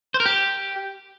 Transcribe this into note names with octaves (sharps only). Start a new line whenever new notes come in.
C5
A#4
G4